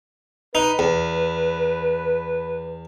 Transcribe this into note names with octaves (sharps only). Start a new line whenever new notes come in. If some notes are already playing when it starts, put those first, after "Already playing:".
D#4 B4
E2